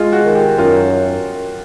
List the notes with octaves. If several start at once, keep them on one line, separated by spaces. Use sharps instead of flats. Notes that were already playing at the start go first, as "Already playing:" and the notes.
Already playing: G#3 F4
F#4
D#3
G4
F#2 F4